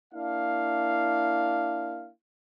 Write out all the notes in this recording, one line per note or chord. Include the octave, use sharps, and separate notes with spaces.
A#3 D4 E4 F5